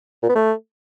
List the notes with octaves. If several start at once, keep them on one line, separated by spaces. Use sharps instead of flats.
A#2
B3
A3